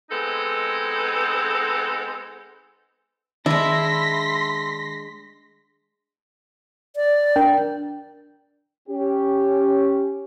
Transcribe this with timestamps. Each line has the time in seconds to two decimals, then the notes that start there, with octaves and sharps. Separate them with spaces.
0.10 G#3 B3 C4 D#4 A4
3.46 D#3 G#3 D4 E4 C6 A#6 B6
6.96 D5
7.36 D4 A#4 G5
8.89 C#4 G4